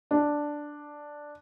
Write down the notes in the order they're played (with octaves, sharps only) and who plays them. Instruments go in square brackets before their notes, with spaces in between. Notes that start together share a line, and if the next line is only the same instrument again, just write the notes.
[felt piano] D4